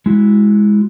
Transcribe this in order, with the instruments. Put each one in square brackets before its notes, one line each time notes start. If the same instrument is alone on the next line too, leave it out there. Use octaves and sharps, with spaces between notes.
[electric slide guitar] G#3 E4 F#4